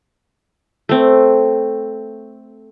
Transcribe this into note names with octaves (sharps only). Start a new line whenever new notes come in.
A3 C4